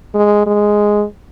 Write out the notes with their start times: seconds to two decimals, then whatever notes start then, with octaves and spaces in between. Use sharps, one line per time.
0.15 G#3
0.47 G#3